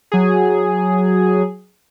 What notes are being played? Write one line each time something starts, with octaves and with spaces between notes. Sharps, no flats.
F#3 G#4